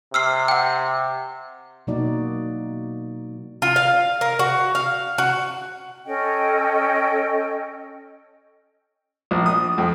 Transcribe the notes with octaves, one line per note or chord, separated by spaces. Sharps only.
C3 E6 F6 C7
F#5 G5
B2 F#3 A#3 D#4 F#4 D5
F4
F5
A#4
F#4
F5
F#4
C#4 A4 D#5 G5
A#1
D#6
F2